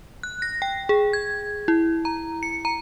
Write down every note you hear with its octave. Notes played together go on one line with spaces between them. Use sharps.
F#6
A#6
G5
G#4
G#6
E4
A#5
C#7
A#5